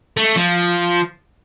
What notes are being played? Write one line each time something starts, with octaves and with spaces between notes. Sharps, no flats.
A3
F3